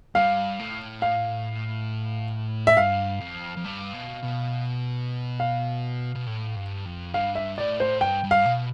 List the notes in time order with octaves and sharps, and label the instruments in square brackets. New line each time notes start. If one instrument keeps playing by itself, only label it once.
[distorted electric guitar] G2 [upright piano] F5
[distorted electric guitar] A2
[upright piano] F5
E5
[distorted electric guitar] G2 [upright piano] F5
[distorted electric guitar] F2
F2
G2
B2
B2
[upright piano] F5
[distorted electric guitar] B2
A2
G2
F2
[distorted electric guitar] G2 [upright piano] F5
[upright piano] E5
[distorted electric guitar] A2 [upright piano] D5
[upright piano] C5
[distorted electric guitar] G2 [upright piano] G5
[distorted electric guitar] G2
[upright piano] F5
[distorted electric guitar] B2